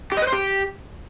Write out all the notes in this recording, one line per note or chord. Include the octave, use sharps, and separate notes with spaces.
G4
D#5
B4
C5
G4